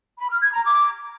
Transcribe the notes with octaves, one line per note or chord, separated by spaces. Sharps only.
B5
F6
G#6
A#5
D6